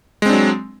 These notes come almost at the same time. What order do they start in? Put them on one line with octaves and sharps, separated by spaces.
G#3 C4 D4 F#3